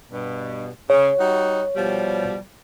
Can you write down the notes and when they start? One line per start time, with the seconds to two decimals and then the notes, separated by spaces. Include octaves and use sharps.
0.12 G2 B2
0.90 C#3 C#5
1.19 G3 D#4 F#4
1.76 B2 F3 G3